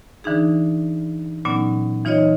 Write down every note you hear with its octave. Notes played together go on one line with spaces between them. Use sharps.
D3 E3 D4 D#4 G#4
A#2 D3 F#3 B3 C#4 D#4
E3 D#4 F4 C#5 D#5